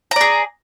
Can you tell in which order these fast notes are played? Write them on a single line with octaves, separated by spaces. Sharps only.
A#5 D5 G#4